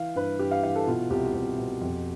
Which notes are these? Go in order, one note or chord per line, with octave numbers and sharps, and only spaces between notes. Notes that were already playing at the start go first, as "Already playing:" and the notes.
Already playing: E3 F5
G2 B4
G2 G4
F5
E3 F5
A4
B2 F4
C2 G4
C2
B2
F2